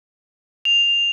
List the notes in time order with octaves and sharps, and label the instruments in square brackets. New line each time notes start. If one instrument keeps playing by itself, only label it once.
[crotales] F7